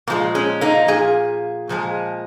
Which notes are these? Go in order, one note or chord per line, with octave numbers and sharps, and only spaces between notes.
A#2 F3 G#3 A#3
G#3 C#4
A#3 D#4
A#2 F3 G#4
A#2 F3 G#3